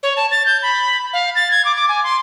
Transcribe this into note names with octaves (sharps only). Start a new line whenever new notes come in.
C#5
A5
A6
G6
B5
F5
A6
G#6
D6
D6
G#5
C6